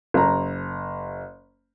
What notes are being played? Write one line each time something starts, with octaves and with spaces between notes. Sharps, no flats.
F#1 A#5